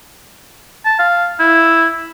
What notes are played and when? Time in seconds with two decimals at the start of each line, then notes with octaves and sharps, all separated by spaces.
0.85 A5
0.99 F5
1.40 E4